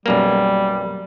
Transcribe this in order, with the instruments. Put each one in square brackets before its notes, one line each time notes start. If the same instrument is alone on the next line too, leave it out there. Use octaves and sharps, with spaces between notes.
[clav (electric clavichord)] B1 F#2 A#3 [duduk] G3